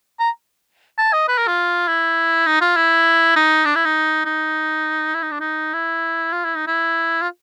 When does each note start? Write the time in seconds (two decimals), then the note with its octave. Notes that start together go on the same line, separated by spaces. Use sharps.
0.19 A#5
0.98 A5
1.13 D#5
1.28 B4
1.38 A#4
1.47 F4
1.88 E4
2.46 D#4
2.61 F4
2.76 E4
3.36 D#4
3.65 D4
3.75 E4
3.85 D#4
4.25 D#4
5.14 E4
5.22 D#4
5.31 D4
5.40 D#4
5.73 E4
6.32 F4
6.44 E4
6.56 D#4
6.67 E4
7.22 F4